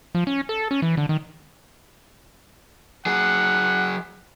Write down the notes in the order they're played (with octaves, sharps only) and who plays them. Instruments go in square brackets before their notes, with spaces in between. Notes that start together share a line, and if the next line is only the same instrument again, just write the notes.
[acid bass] F3
C#4
A4
C#4
E3
D3
D#3
[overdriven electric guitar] F#3 G#4 [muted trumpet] F#5